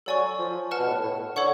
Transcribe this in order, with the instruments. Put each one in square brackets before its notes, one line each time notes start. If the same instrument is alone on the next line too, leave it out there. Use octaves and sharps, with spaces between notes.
[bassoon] F#3 [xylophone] A4 D5 G#5 C#6
[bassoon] F3
[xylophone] B4 F#5 A5 F6
[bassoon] B2
A2
A2
[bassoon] D3 [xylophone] A4 C#5 F#5 C#6